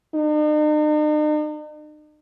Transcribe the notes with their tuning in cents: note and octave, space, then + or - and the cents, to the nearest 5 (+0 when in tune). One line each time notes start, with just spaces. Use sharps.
D#4 -45